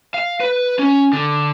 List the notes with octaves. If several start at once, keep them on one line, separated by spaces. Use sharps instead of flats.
F5
B4
C#4
D3